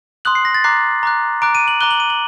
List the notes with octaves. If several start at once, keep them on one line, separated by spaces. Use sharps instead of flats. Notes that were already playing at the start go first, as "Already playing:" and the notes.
C6 D#6 F#6 F#7
C7
A#6
A6
A#5 D6 F#6 C7
A#5 D6 F#6
A#5 D6 F#6 D7
D#7
F#7
A#5 D6 F#6 G7
F#7
D#7
F#7